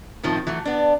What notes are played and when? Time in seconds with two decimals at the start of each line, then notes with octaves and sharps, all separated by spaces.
0.23 A2 D#3 F3 C4
0.47 E3 F#3 A3
0.65 B3 D4